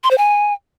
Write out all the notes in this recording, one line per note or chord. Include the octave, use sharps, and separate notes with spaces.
C6
C5
G#5